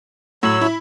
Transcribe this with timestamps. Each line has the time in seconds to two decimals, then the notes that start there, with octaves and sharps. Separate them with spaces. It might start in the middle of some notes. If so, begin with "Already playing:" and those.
0.43 A2 F#3 C#5 E6 F#7
0.61 E4